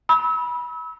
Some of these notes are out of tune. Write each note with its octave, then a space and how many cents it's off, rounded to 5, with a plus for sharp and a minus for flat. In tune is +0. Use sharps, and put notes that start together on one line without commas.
B5 -25 E6 -35